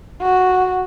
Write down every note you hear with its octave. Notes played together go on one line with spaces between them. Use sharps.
F#4